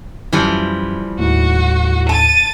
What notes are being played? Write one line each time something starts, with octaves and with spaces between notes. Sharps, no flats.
F#2 E3 F3 G3
D#2 A2 F#4
A5 A6 D#7